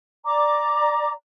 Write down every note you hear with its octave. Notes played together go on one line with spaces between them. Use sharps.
D5 A#5 D6